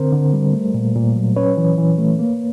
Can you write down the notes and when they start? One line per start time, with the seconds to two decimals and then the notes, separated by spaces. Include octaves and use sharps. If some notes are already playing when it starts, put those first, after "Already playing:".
Already playing: D3 C4 A#4 C5
0.12 D3
0.33 G3
0.53 A3
0.74 A#2
0.95 A#2
1.16 F#3
1.36 C#4 B4 C#5
1.57 E3
1.78 E3
1.98 A3
2.19 A#3